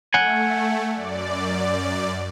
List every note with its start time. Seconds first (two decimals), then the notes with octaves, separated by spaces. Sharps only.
0.14 A3 F#5 G#5
0.91 F#2 D5